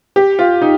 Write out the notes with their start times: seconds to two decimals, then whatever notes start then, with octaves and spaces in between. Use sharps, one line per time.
0.16 G4
0.39 F4
0.62 D#4